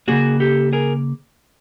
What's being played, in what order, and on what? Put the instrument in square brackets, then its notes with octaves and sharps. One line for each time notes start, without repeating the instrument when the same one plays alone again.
[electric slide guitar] C#3 F3 A#3 F#4 G#4
G4 A4
G#4 A#4